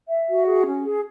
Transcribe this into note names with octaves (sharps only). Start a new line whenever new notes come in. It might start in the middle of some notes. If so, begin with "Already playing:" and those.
E5
F#4
G#4
C#4
G#4